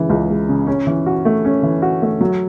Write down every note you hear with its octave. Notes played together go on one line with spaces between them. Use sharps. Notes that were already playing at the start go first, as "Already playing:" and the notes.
Already playing: C#3 E3 G#3
C#2
G#3
C#3
C#4
E3
F#4
A3
C#4
E3
F#4
A3
F#3